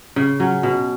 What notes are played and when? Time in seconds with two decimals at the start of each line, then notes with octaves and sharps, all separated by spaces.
0.16 C#3
0.40 F#3 C#4
0.63 B2